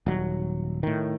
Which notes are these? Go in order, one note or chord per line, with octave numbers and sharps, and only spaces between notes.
D#1 F#3
A2 D#3